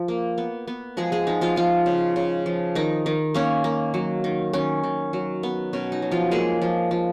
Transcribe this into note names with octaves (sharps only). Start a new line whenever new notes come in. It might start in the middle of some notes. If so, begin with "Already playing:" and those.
Already playing: F3
A#3
B3
B3
F3 G#3 G#4
G#3 G#4
F3 D#4
F3 F4
F3 G#3 F4
C#3
C#3
F3
D#3 D#4
D#3
A#3 C#4
A#3
F#3
D#3
D#3 C#4
D#3
F#3
B3
B2 C#4
D#4
F#3
F3 F4
G#3 A#3 G#4
F3
F3